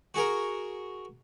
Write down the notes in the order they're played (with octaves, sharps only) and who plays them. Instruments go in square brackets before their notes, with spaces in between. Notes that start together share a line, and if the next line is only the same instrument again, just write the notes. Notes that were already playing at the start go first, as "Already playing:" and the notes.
[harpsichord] F#4 G#4 A#4